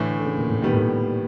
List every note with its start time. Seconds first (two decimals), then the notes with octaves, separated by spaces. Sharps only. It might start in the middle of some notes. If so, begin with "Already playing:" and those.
Already playing: A2 D3 E3 A3
0.20 D3
0.26 C#3
0.38 A#2
0.49 A2
0.62 A#2 D#3 G3 B3
0.73 A2
0.83 A#2